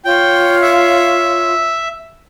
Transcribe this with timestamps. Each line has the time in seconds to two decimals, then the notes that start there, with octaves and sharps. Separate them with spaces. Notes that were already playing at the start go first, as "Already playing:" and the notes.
0.05 F4 C#5 G5
0.62 E5